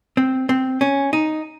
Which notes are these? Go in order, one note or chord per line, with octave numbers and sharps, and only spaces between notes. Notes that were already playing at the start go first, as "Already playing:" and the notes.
C4
C4
C#4
D#4